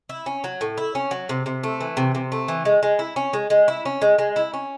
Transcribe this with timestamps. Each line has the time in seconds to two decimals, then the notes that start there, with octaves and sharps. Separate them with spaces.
0.09 E4
0.26 C#4
0.44 F#3
0.61 A2
0.78 E4
0.95 C#4
1.11 F#3
1.29 C3
1.46 C3
1.63 A3
1.81 E3
1.97 C3
2.15 C3
2.32 A3
2.48 E3
2.65 G#3
2.83 G#3
2.99 E4
3.16 C#4
3.33 G#3
3.50 G#3
3.68 E4
3.85 C#4
4.02 G#3
4.18 G#3
4.36 E4
4.54 C#4